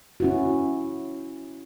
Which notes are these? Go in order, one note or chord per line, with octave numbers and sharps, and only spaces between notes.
C#4 E4 F#4